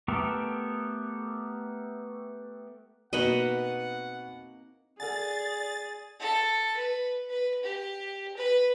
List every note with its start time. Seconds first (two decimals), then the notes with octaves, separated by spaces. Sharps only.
0.08 A3 B3 G4 A4 A#4
3.13 B2 A#3 C4 D#4 F#4 B4 D#5 F#5
5.00 G#4 A4 D5 F#5 G#5 A6
6.20 A4
6.76 B4
7.30 B4
7.64 G4
8.37 B4